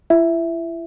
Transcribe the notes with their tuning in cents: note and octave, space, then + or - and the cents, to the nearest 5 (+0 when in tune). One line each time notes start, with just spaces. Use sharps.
E4 +35 E5 +0